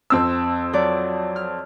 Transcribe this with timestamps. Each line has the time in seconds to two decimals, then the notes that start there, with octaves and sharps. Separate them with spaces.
0.10 F2 C4 E6
0.73 F#3 D5
1.36 F6